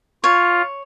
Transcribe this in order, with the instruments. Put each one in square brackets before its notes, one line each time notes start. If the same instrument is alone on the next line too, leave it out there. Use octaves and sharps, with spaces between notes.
[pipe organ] F4 [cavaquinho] C#5